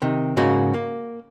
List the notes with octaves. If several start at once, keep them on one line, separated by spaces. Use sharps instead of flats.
C3 D#3
G#2 C#3 A#3 F#4
A#3